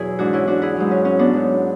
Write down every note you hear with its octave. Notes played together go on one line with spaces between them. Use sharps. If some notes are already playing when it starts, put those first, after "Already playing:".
Already playing: E2 B2 F#3 E4 G#4
G#2 E3 D4 F#4
C#4 E4
D4 F#4
E4 G#4
G#2 F#3
C#4
C#4
B3 D4
G#2 F#3